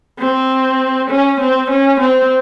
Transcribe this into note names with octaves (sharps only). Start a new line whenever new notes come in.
C4
C#4
C4
C#4
C4